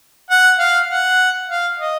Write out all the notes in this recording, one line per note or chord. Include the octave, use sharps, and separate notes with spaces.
F#5
F5
F#5
F5
D#5